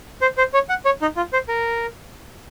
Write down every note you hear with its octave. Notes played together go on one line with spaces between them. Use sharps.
C5
C5
C#5
F#5
C#5
D#4
F4
C5
A#4